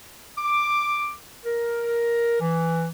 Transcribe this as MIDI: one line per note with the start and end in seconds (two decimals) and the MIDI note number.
0.37 1.11 86
1.45 2.38 70
2.40 2.87 52